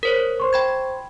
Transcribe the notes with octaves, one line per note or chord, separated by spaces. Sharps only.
A#4 C5 C#5
C5 C6 C#6
G5 B5 G#6